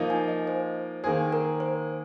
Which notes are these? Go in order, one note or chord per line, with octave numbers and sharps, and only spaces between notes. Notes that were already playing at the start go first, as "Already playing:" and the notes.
Already playing: F3 A#3 D#4
G#5
D#5
C5
D#3 A#3 G#4 C5
A#4
C5